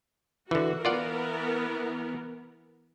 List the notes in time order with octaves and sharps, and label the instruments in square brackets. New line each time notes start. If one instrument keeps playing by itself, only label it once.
[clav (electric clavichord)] D3 E3 [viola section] F#4
[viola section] E3 B3 A#4 [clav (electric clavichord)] F4 D5 F#5